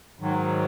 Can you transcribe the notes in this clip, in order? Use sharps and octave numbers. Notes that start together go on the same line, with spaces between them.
G#2 D#3 F#3